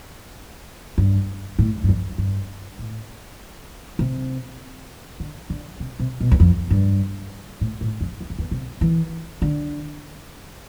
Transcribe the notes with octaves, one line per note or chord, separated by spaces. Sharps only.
G2
A2
G2
F2
G2
A2
C3
D3
D3
C3
C3
B2
E2
F2
G2
A2
A2
F2
E2
F2
E2
C3
E3
D3